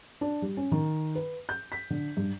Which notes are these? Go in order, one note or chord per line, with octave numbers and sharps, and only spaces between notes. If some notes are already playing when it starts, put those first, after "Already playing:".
D4
G3
C#4
D#3
B4
G6
B6
D3
G2